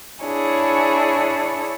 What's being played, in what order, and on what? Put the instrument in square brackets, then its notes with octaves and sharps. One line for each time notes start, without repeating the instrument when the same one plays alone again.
[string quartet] D4 E4 G#4 C#5